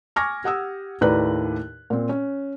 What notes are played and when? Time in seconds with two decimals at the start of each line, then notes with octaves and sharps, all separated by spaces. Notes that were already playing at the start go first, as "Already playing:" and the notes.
0.16 G#5 C#6 D6 F6 G#6 A#6
0.44 G4 F#5 D#6 E6
1.01 D#2 A2 B4 D5 A#5 F#6
1.90 A#2 C4
2.09 C#4